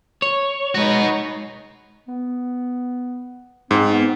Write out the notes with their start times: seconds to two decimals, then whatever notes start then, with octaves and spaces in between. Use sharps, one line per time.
0.22 C#5
0.75 G#3 D#4 F#4 B4
2.08 B3
3.71 G#2 C4
3.92 B3